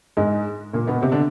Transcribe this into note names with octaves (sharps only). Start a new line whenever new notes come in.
G#2 G#3
A#2 A#3
B2 B3
C3 C4
D3 D4